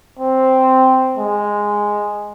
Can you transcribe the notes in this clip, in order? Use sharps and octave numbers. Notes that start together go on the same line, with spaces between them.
C4
G#3